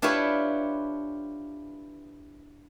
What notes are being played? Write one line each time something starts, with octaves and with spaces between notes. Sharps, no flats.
D4 E4 F4 G4 B4 C#5